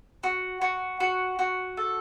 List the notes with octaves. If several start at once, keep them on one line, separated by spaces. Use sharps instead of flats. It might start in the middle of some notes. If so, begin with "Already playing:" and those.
F#4
F#4
F#4
F#4
A4